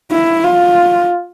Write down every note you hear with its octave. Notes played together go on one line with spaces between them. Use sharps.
E4
F4